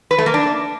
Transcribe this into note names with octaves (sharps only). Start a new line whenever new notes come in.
B4
A3
A#3
D4